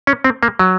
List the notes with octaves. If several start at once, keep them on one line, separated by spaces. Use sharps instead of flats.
C#4
C4
A#3
F#3